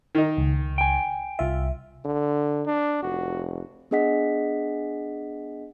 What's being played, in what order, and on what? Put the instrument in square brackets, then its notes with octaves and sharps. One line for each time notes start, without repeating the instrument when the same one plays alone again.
[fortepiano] D#3 D#4
[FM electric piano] C#2
[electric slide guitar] G5 G#5
[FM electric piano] C2 E5 [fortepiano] F4
[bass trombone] D3
[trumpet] D4
[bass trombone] F1 [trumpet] F#4
[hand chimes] B3 D4 G#4 D#5 F#5 B6